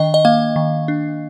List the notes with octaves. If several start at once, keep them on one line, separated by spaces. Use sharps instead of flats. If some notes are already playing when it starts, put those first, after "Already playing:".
Already playing: D#3 D4 D#5 G5
D#5
A#3 F5
D#3
D4